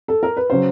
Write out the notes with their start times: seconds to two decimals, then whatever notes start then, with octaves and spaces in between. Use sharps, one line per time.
0.08 A4
0.23 A#4
0.37 B4
0.50 C#3 F#3 C5